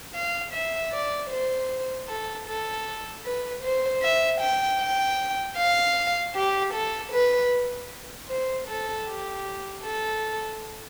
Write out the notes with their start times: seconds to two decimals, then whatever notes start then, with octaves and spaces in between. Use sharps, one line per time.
0.14 F5
0.53 E5
0.92 D5
1.30 C5
2.09 A4
2.47 A4
3.25 B4
3.63 C5
4.02 E5
4.40 G5
4.80 G5
5.57 F5
6.35 G4
6.74 A4
7.12 B4
8.29 C5
8.67 A4
9.07 G4
9.83 A4